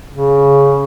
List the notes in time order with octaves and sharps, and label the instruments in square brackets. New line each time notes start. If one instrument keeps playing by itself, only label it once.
[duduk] C#3